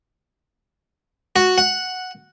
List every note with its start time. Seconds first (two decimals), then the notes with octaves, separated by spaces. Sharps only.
1.36 F#4
1.58 F#5